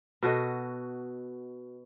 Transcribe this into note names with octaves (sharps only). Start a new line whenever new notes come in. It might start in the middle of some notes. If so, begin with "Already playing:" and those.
B2 F#4 A4 D#5